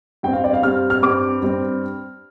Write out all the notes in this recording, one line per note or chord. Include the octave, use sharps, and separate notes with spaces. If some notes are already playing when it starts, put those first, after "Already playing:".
G2 G3 C4 G5
F5
D5
F5
G2 G3 C4 F6
F6
G2 G3 C4 D6
G2 G3 C4